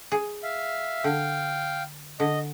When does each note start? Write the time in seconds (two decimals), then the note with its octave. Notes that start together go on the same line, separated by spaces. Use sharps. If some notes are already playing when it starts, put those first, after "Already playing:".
0.12 G#4
0.43 E5 F5
1.04 D3 F5 G5
2.20 D3 D#5